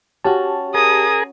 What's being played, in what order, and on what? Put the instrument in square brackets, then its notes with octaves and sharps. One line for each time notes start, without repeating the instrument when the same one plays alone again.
[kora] C#4 F#4 [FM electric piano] G4 A5
[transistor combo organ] G#4 A#4 [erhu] D#6